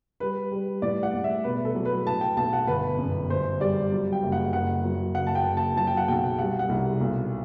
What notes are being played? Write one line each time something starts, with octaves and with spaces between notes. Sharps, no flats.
G3 B4
G3
A2 D5
F#5
A2
E5
B2 B4
A4
F#3
B4
A2 A5
G5
B1 A5
F#5
G1 B4
F#2
G1 C5
G3 D5
F#3
G5
F#1
F#5
F#1 F#5
F#3
F#1 F#5
A5
G5
F#1
A5
F#3 A5
G5
F#5
B1 G5
G3 F#5
F#5
C2
B1